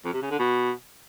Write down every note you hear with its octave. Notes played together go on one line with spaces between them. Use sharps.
F2
C3
C#3
D3
B2